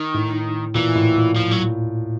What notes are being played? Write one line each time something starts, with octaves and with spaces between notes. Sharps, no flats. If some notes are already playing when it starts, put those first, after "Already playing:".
Already playing: D#3
A2
A#2 E3
A2
A#2
F3
F#3